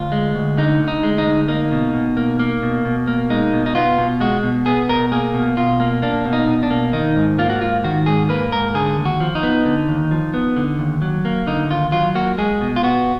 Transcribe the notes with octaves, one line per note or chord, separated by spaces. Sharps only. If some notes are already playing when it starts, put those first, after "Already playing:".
Already playing: D2 F4
G#3
D2
D3 D#4
D2
D#4
G#3
D#4
D2
A#3 D#4
B2
B2
A#3
A#3
B2
B2
A#3
G#3 D#4
B2
D#4
B3 F4
B2
G#3 F#4
B2
B3 G#4
B2 A#4
A#3 G#4
B2
B2 F4
A#3
A#3 D4
B2
D#4
B2
D4
A#3
D#3 D#4
G#2
A#3 F4
F#4
G#2 F4
D#3 F#4
G#2 G#4
A#3 B4
G#2 A#4
D3 G#4
D#2
F#4
F3
D#4
B3
D3
D#2
F3
B3
D3
D#2
F#3
A#3
D3 D#4
D#2 F4
F#3 F4
A#3 F#4
G#3 G#4
B2
F4
B3 F#4